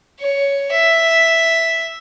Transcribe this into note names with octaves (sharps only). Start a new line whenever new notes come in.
C#5
E5